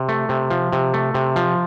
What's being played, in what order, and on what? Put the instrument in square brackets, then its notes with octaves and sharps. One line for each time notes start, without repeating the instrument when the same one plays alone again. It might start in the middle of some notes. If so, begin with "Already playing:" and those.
Already playing: [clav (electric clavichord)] C3
A3
C3
F3
C3
A3
C3
F3